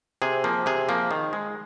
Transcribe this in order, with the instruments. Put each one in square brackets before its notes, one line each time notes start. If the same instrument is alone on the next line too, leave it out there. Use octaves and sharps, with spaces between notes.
[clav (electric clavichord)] C3 G#4
F3 A#3
C3 G#4
F3 A#3
D#3
G#3